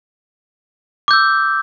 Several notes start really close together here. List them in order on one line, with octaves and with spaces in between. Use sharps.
D6 G6 E6